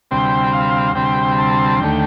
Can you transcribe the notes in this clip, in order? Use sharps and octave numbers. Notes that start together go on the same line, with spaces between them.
D2 C3 G3 C4 G5
F5
D2 C3 G3 C4 G5
A5
D#2 D3 A3 G5